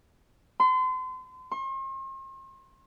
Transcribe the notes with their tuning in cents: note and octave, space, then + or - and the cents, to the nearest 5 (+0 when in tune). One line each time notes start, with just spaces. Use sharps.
C6 -35
C6 +45